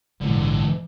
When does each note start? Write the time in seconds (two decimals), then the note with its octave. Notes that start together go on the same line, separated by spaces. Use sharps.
0.21 A#1 G#2 D3 E3